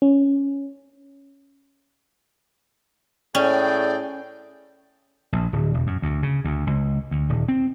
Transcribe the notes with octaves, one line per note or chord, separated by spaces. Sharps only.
C#4
A2 C#4 G#4 D5 G5
A#1
D1
E1
F#2
D2
C#3
D2
C#2
D2
D#1
C4